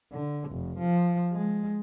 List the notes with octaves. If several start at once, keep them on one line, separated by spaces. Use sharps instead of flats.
D3
F1
F3
G#3